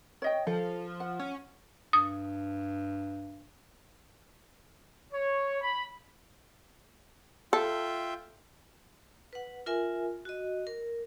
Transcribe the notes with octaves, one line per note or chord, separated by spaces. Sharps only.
C#5 D#5 G5
F3 A4
F#5
C#4
G2 D#6
C#5
B5
F4 A4 E5 G5
B4 F#5
F4 A#4 E5 G#5
F#4 D#5
A#4